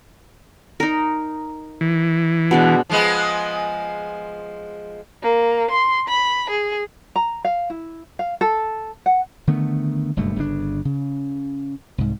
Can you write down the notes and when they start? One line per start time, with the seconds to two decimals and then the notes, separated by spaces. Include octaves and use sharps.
0.80 D#4 A#4
1.81 E3
2.51 B2 G#3 D4
2.90 F3 G#3 B3
5.22 A#3
5.70 C6
6.08 B5
6.49 G#4
7.16 A#5
7.45 F5
7.70 E4
8.19 F5
8.41 A4
9.06 F#5
9.47 D3 D#3 A3 B3
10.17 F#1 G2 B2 A3
10.36 G1 C#3 C4 D4
10.85 C#3
11.98 C2 G#2